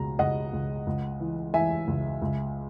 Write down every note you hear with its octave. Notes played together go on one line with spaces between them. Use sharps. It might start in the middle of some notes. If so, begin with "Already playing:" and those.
Already playing: C#2 B2 A#5
C#2 D#5 F#5
C#2
C#2
E3
E3 E5 G#5
C#2
C#2